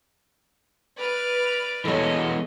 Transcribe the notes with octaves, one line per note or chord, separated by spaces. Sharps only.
B4 D5 F6
E3 G#3 B3 A4 C#5 D#5